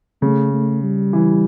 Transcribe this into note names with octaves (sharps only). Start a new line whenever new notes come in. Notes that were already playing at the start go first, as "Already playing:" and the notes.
C#3 A3
A3
G3
E3